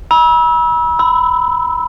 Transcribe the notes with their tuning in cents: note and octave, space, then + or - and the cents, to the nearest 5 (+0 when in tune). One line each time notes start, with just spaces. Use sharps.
B5 -40 E6 -20
B5 +25 E6 -5